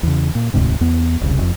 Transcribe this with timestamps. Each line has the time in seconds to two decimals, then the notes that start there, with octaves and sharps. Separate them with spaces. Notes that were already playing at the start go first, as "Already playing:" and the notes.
0.03 E2 C#3
0.35 A#2
0.54 E1 D2 G#2 C3
0.81 E2 B3
1.21 E1 C2 C#3
1.38 F1 F2